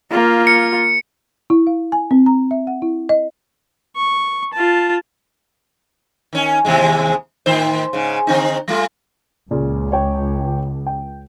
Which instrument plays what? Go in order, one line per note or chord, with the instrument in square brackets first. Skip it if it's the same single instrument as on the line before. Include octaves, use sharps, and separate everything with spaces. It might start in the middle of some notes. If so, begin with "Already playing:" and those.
[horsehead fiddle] A#3 F4
[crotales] C#7
[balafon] E4
F5
G#5
C4
A#5
E5
F#5
E4
D#5
[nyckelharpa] C#6
F4 A5
[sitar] D#3 C#4
D#2 C3 G#3
A2 D#3 C5
G#2 C#3
D3 C4 D#4
G3 A3 F4
[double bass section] C#2 [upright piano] A#2 C#3
[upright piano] C#5 G5
G5